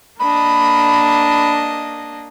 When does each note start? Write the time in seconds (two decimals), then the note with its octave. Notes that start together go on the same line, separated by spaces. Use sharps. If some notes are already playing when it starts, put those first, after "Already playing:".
0.19 A#3 D4 D#5 B5